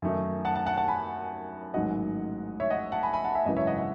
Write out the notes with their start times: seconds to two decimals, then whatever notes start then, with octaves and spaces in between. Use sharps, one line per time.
0.02 F#2 D#3 A3 D#4
0.45 F#5 A5
0.55 F#5 A5
0.66 F#5 A5
0.77 F#5 A5
0.88 G#5 B5
1.74 A1 G#2 D#3 F#3 D#5 F#5
2.60 C#5 E5
2.70 D#5 F#5
2.92 F#5 A5
3.03 G#5 B5
3.13 G#5 B5
3.24 F#5 A5
3.35 E5 G#5
3.46 G#1 F#2 C#3 E3 D#5
3.57 C#5 E5
3.67 D#5 F#5
3.78 D#5 F#5